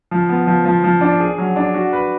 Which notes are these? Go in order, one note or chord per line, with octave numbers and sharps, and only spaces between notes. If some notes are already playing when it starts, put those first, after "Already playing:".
F3
B3
F3
F3
F3
D4
G#4
F#3
D4
F#4
B4